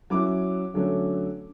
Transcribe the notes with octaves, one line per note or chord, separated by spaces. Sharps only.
F#3 C#4 E4 D6
D3 F#3 A3 C#4